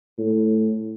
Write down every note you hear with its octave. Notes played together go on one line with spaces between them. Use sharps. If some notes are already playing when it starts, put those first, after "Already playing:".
A2